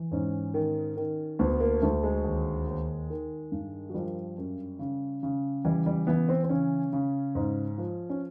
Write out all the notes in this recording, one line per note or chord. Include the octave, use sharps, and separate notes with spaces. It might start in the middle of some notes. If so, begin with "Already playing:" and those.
Already playing: E3
G#2 C#4
D#3
D#3
D2 B3
A#3
D2 A3
G#3
D#2
D#2
D#3
G2
F#3
F3 G3
F#2
C#3
C#3
E3 G3
G3
E3 B3
C4
C4
C#3 C#4
C#3
G#2
F3
C#4